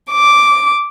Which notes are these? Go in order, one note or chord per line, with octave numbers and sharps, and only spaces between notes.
D6